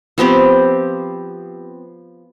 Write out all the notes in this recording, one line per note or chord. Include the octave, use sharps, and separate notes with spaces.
F3 B3 C4 G4